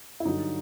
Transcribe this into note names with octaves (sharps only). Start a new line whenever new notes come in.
E4
G2 D3 F#3 D#4